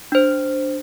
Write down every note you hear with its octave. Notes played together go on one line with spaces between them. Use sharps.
D4 C5